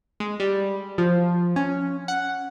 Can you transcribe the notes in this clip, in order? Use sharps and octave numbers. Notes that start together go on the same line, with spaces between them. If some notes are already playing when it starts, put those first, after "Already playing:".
G#3
G3
F3
C#4
F#5